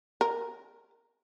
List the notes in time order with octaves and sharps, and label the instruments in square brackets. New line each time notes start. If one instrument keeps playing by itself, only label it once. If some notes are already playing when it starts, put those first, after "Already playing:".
[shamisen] A#4